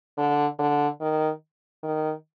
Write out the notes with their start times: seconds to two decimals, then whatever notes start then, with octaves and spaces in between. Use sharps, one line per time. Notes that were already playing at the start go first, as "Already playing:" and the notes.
0.18 D3
0.59 D3
1.01 D#3
1.83 D#3